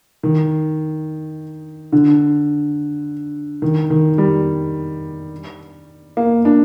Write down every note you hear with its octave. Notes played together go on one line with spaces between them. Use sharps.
D#3
D3
D#3
D#3
G3
A#3
D4